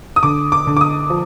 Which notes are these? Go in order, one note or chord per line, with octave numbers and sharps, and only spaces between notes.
D#6
D3 D6
D6
D3
D6
D#6
F3